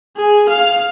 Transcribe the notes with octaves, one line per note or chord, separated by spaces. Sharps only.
G#4
F5